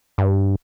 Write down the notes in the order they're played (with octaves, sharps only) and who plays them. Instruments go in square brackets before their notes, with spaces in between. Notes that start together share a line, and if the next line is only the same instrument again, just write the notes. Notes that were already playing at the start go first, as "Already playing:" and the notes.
[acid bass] G2